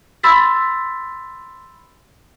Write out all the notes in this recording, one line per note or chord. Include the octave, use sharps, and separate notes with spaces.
B5 C6 E6 A6 B6